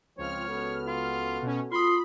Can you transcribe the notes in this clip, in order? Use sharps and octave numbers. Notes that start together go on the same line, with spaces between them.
C#2 F3 C4 C#5 F6
B3 F#4 A4
F4
B2 C#4
F4 B5 C6 D#6